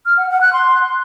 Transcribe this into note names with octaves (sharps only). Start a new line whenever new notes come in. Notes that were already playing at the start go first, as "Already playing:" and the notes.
F6
F#5
F#5
F#6
C6